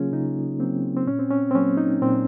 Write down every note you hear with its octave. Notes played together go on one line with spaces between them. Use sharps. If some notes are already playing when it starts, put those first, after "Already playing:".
Already playing: C#3 F#3 A#3 C#4 F4 G#4
C#3 D#4
F#3 A#3 C4
C4
A#2 C#4
C4
C#4
C4
F#3 A#3 C#4
D#4
A#2 C4